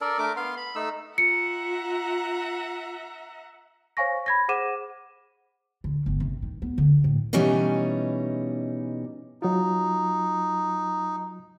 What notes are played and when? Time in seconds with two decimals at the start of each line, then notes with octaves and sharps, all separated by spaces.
0.01 D4 A4 A#4 D5
0.19 A3 D4 A#4 D6
0.36 B3 F5 C6
0.57 B5
0.75 A3 D#4 E6
1.18 F4 E5 F#5 A#5 C#7
3.97 C5 C#5 F5 G#5 C#6 A#6
4.26 B5 G#6 A#6
4.49 G#4 C5 F#5 D6 D#7 E7
5.84 D3
6.06 G1
6.20 C3
6.42 D#3
6.62 B3
6.78 D3
7.04 A2
7.33 B2 E3 G3 C#4 D#4
9.42 F#3 D#4 F4